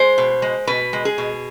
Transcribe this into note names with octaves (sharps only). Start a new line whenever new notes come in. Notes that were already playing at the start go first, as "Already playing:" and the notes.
Already playing: G#3 C5
B2
G#3
B2 B4
G#3
G#4
B2